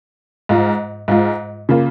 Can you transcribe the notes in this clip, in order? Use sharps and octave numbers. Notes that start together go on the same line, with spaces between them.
G#2 G#3 F4
G#2 G#3 F4
C#3 A#3 F4